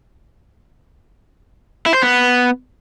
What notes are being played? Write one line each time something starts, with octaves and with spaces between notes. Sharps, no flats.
E4
C5
B3